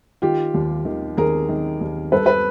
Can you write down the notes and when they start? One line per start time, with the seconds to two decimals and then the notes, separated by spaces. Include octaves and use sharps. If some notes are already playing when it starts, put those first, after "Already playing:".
0.22 D#3 F4 G4
0.54 D#2
0.85 D#3
1.17 D#2 G#4 A#4
1.49 D#3
1.81 D#2
2.12 G2 A4 B4
2.26 B4